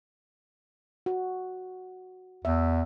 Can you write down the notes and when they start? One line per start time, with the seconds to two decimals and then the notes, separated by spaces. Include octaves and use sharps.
1.06 F#4
2.45 E2 E5